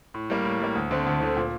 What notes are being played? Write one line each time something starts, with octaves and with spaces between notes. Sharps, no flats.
A2
G3 A#3
A2
G3 A#3
D2
D3 A3 C4
D2
D3 A3 C4
A#2